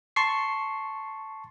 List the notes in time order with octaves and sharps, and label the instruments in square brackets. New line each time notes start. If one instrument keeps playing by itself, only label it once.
[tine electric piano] A5 C6 C#6 C7